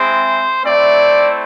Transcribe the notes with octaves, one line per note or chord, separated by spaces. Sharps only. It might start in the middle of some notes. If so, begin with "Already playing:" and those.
Already playing: G#3 C4 E4 C5
A3 C4 E4 D5